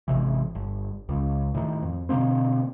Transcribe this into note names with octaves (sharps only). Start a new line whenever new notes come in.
G#1 C3 E3
G1
C#2
A2 D#3
F2
B2 D3 A#3 C4